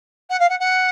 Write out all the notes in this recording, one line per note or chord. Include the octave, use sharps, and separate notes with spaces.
F#5
F5
F#5
F#5